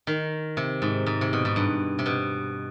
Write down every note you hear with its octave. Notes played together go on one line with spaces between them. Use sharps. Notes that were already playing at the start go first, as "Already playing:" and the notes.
D#3
C3
G#2
G#2
C3
B2
G#2
G2
C3
B2